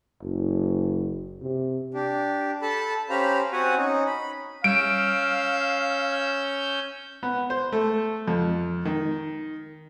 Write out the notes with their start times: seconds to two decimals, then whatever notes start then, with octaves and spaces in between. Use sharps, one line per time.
0.21 F#1
1.41 C3
1.94 D4 G4
2.62 A4 A5 B5
3.10 C#4 G4 C5 F5 A#5 B5
3.53 C4 F#4 F#5 G#5
3.77 C#4 D#4
4.07 B5
4.64 G3 C#4 F5 E6 G6 D7
7.23 B3
7.50 C5
7.72 A3
8.28 F2
8.85 D#3